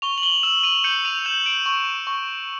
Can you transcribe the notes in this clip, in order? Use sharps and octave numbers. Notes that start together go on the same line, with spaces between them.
C#6 F7 G7
F#7
F7 G7
E6 E7 F#7
D#7 F7
G6 C#7 D#7
D#7 F7
G6 E7 F#7
D7 E7
C#6
C#6